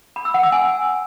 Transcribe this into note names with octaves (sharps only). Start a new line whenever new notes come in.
B5
E6
F#5
E6
G#5